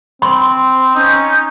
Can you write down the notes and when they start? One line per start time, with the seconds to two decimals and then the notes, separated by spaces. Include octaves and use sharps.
0.22 C4 B5 C6
0.95 C#4 D#4 G6